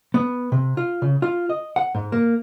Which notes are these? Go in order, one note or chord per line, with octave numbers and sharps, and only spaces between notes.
B3
C3
F4
C#3
F4
D#5
F#5
G#2
A#3